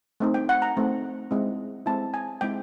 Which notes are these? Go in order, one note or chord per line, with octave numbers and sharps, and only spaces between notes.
A3 C4 D#4
G5
F#5
A#5
A3 C4 D#4
G#3 C4 E4
G#3 C4 E4 A5
G#5
G#3 C4 E4 G5